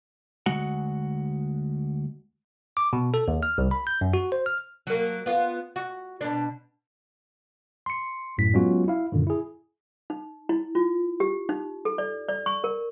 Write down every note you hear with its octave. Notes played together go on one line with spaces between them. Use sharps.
D2 G#3 F#4 F#5
D6
B2
A4
D#2
F6
C2
B5
G6
F#2
F#4
C5
F6
F#3 A#3
B3 F4
F#4
B2 D4
C6 C#7
F#2 A2 B6
F#3 G#3 B3 C#4 F4 F#4
E4 F5
F#2 A#2 D3 D#3
E4 G#4
D#4
E4
F4
G4
D#4
A4
D5
D5
C#6
A#4